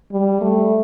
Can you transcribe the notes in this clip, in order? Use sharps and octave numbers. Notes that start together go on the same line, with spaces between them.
G3
A3